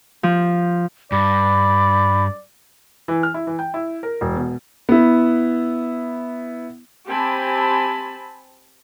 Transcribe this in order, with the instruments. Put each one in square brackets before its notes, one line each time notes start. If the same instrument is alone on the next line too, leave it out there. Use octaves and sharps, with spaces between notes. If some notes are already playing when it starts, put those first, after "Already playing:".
[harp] F3
[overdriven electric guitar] G2 [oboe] D5 [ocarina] B5
[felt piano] E3
F6
E4
E3
G5
E4
A#4
E1
B2
[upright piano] B3 E4
[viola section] C4 G4 G#5 A5 B5